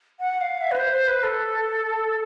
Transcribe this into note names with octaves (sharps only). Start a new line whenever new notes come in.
F#5
F5
E5
B4
C5
C5
B4
A4